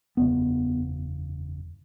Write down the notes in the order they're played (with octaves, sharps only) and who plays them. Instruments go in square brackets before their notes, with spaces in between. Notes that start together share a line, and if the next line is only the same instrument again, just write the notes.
[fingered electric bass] F#1 E2 C#3 B3